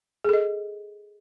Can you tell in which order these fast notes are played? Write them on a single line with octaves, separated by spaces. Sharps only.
G#4 A4 D#5